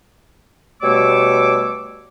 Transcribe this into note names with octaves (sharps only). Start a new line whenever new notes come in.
B2 G3 A3 C#5 D6 E6